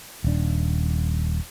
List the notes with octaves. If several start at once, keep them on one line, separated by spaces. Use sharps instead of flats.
D#1 D4